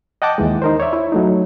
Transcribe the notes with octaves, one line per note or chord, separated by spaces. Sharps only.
D#5 F#5 G5 A5 D6
D#2 E3 G#3
D#4 A#4 C5
C#5 D5 E5
E4
F#3 A3 D#4